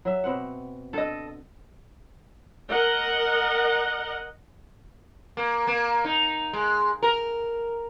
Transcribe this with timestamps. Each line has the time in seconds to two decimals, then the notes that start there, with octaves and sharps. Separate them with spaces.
0.05 F#3 E5
0.24 B2 C4 F#5
0.93 D3 A4 D#5
2.71 A#4 D#5 F#5
5.37 A#3
5.67 A#3
6.05 D#4
6.53 G#3
7.03 A#4